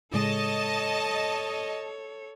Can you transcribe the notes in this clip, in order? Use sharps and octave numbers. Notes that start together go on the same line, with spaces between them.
A2 C#3 G#3 A4 C#5 D#5 A5